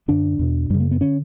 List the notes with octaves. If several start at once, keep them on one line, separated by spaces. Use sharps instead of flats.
F#2 D3 D4
E2 B2
F#2 C#3 G3
A#3
B3
D3 C#4